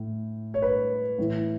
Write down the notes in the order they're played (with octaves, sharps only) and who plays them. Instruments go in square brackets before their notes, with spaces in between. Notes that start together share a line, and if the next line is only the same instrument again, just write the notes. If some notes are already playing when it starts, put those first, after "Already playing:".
Already playing: [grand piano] A2
C#5
B4
A2 E3